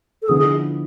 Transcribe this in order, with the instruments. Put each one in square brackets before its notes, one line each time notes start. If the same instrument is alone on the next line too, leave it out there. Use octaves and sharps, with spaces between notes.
[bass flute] A4
[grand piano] D3 F3 B3 E4 [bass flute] G#4